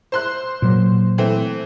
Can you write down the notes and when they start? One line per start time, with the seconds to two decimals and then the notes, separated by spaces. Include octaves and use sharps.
0.12 C5 C6 F#6
0.62 A#2 F#3
1.18 E3 A3 C4